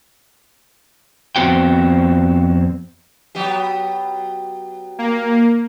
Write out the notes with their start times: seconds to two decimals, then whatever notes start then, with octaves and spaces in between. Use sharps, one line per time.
1.36 F2 G3 B3 C4 F#4 G5
3.35 F#3 B3 G4
4.99 A#3